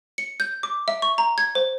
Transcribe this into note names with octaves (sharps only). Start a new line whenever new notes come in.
C#7
G6
D6
E5
C#6
A#5
G#6
C5